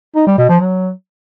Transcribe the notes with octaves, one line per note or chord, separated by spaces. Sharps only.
D#4
G3
B2
F3
F#3